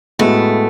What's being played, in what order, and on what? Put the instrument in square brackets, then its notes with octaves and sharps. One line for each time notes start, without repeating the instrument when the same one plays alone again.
[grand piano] A2 G#3 B3 F#4 [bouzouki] A3